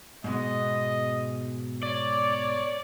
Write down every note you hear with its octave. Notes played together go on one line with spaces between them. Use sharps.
G#2 B2 G#3 D#5
C#5 D5